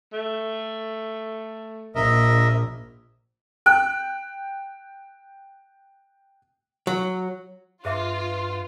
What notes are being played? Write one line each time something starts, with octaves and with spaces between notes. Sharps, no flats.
A3
A#1 A#4 D#5 E5
G5 F#6
F#3
G2 F4 G#4 B4 E5 D6